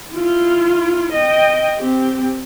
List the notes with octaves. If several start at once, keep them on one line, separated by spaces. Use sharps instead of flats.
E4 F4
D#5 G5
C4 G4